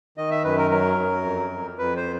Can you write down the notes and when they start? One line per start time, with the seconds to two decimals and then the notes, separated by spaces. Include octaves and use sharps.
0.17 D#3 D#5
0.31 E5
0.44 F#2 B4
0.58 A#4
0.71 F#3 A#4
0.98 F#2
1.24 F2
1.51 F2
1.78 F2 B4
1.96 C5